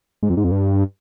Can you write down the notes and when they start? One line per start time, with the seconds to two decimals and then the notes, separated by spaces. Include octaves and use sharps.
0.23 G#2
0.30 F2
0.37 G#2
0.44 F2
0.51 G2